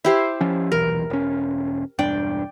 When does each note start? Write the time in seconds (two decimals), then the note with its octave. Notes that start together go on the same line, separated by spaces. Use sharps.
0.05 E4 G4 C5
0.41 F3 C#4
0.72 D#1 B1 E3 A#4
1.10 E1 C#4
1.99 E1 G2 D4 D5 G5